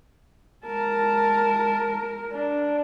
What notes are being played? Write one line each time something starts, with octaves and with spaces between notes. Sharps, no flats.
G#3 A#4 A5
D4